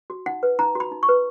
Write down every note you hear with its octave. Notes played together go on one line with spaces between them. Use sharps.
F#4
D#4 F#5
B4
D#4 A#5
F#4 B5
D#4
C#6
B4